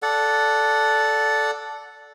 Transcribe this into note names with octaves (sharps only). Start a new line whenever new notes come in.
A4 D5 F#5